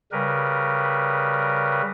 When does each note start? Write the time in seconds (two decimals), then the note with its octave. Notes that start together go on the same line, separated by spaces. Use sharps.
0.12 C#3 G3 A#4 B4